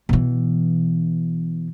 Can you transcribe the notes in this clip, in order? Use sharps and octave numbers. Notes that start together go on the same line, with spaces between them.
B2 E3